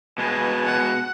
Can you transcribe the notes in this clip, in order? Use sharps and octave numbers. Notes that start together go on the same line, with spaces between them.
B2 G#3 B4 G#5 A5
F#5